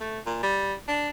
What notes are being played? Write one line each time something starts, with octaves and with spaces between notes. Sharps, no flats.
A3
A#2
G3
D4